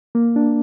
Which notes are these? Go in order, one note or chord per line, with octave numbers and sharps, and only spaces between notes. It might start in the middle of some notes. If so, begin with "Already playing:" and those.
A#3
D4